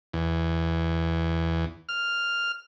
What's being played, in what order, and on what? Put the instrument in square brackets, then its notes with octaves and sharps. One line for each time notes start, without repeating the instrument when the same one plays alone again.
[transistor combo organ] E2
F6